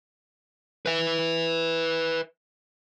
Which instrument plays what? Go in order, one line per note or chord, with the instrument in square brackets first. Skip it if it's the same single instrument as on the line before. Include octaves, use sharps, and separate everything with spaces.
[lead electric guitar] B4 E5